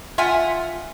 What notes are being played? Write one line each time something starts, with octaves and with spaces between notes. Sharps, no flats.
F4 E5 F#5 G#5